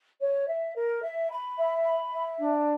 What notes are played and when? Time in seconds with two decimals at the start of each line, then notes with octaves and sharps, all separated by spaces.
0.21 C#5
0.48 E5
0.76 A#4
1.03 E5
1.30 B5
1.58 E5
1.85 B5
2.12 E5
2.40 D4